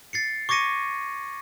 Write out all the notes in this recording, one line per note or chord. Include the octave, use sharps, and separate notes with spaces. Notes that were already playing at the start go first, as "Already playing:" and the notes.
A6 C7 C#7
C#6 D6 G#6 A#6 C#7 D#7